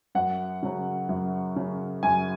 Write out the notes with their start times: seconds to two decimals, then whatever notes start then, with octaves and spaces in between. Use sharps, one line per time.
0.15 F#2 F#5
0.63 C#3 F#3
1.09 F#2
1.56 C#3 F#3
2.03 F#2 G#5